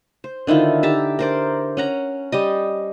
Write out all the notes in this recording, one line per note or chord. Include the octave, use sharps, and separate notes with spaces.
C5
D3 D#3 E4 F4
G4 E5 A5 A#5
A#4 C5 D5
C#4 F#5 A#5
G3 G4 D#5